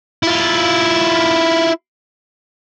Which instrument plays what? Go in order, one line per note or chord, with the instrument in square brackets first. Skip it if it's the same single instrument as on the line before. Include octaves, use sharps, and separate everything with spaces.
[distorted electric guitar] E4 F4